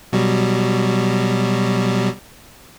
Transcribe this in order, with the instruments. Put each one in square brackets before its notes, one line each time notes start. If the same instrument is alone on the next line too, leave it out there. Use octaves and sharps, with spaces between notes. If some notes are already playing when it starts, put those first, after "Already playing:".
[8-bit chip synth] B2 F#3 G3